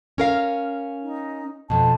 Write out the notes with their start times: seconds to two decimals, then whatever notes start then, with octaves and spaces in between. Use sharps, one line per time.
0.18 C#4 A#4 F5
1.02 D#4
1.70 F2 B2 A5